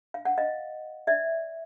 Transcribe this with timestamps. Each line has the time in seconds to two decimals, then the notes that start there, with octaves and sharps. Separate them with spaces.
0.14 F5
0.25 F#5
0.38 D#5 F5
1.07 D5 E5